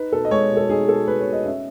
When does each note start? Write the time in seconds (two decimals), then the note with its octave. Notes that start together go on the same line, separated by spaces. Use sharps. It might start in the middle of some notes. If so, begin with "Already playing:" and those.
Already playing: D#4 B4
0.12 B2 A4
0.25 D#5
0.31 G#3 C#5
0.51 B2
0.57 A4
0.69 D#4 G#4
0.89 B2 A4
1.07 G#3 B4
1.20 C#5
1.26 B2
1.33 D#5
1.45 C#4 E5